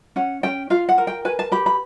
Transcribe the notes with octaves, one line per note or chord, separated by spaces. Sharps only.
C#4 F#5
C#4 G5
F4 F5
F#5
A#4
G5
B4 G#5
A5
G4 B5
B5